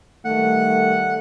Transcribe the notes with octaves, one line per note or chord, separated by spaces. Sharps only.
D#3 G3 A3 F#5